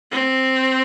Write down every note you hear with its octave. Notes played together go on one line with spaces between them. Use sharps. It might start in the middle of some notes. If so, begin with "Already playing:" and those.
C4